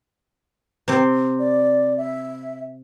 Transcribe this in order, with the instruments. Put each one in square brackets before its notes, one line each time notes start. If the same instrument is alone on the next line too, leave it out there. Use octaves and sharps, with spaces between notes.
[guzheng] C3 C4
[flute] D5
E5